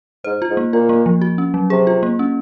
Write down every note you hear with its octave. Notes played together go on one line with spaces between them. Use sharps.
G#2 C5
F4
G#2
A#3
A#2 F4
A#3
F3
F#4
C#4
F#3
C3 G#4
F4
A#3
C#4